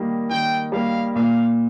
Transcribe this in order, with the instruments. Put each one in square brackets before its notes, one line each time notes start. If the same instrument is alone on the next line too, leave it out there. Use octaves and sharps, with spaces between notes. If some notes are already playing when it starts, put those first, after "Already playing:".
Already playing: [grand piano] D#3 G3 A#3
[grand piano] D#3 [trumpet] G5
[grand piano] G3 A#3 [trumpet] F5
[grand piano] A#2 [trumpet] F5